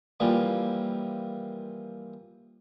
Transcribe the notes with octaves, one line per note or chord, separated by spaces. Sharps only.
E3 F3 G3 A#3 C4